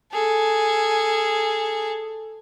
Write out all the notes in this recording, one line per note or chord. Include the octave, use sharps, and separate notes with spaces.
G#4 A4